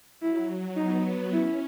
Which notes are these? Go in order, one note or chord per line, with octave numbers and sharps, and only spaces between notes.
F#3 E4
B3 D#4
C#4 E4